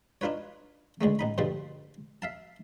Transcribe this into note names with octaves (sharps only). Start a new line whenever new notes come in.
D4 D#4 F4 B4 C#5
C#2 D3 G#3 A3
A1 D#4 B5
G2 B2 D3 F3 G3
E5 F5 A5